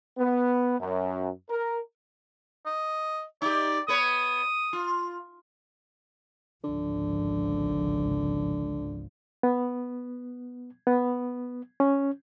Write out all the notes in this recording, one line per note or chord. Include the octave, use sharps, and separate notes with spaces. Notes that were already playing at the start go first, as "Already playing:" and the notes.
B3
F#2
A#4
D#5
D#4 G4 D5
B3 B4 C#5 D#6
F4
G#1 C#2 D3 F3
B3
B3
C#4